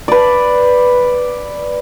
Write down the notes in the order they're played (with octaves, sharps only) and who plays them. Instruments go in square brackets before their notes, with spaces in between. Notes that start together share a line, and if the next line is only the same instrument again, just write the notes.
[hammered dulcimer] B4 D5